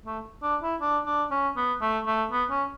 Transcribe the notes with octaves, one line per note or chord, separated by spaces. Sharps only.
A3
D4
E4
D4
D4
C#4
B3
A3
A3
B3
C#4